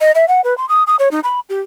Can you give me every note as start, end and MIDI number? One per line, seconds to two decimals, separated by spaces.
0.01 0.12 75
0.15 0.28 76
0.28 0.41 78
0.44 0.57 71
0.58 0.68 84
0.69 0.83 87
0.87 0.96 87
0.99 1.09 73
1.11 1.20 63
1.24 1.40 83
1.49 1.60 67